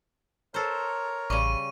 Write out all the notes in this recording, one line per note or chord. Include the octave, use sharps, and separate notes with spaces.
A4 A#4 C5 C#5 A#5
A1 C#3 G3 C#6 D#7